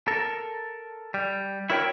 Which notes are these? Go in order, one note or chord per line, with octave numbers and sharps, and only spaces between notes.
A4 A#4
G3
E4 F#4 A#4 C#5 F#5 G5